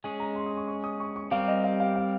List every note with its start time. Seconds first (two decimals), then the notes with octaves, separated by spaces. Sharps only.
0.04 G#3 C#4 G#4 G#5
0.20 A#5
0.36 C6
0.46 D#6
0.57 C#6
0.68 C#6
0.84 D#6
1.00 C#6
1.16 C#6
1.31 G3 C4 G4 A#4 F5
1.48 D#5
1.64 F5
1.80 F5
1.96 F5